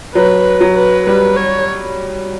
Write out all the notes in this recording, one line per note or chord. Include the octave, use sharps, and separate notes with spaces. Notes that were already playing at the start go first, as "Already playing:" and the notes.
F#3 B4
F#3
B4
G3 B4
C#5